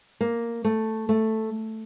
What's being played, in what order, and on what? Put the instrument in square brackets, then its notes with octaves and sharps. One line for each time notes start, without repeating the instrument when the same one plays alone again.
[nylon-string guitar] A#3
A3
A3